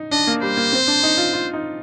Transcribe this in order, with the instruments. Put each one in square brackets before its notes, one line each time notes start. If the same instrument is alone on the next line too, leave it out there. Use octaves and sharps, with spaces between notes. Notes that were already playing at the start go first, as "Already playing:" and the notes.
Already playing: [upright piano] D#4
[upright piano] D4 [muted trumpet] D#5
[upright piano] A#3
[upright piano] G3 [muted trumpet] C5
[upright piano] A#3
C4
D4
D#4
F4
F4
D#4